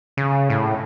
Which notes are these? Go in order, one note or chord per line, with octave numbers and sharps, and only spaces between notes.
C#3
A2